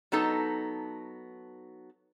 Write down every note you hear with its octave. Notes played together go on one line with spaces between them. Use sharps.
F#3 B3 D#4 A4 A5